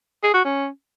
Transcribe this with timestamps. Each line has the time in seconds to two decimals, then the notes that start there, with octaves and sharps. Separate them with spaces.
0.23 G#4
0.34 F#4
0.45 C#4